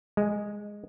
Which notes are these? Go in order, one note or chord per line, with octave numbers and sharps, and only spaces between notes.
G#3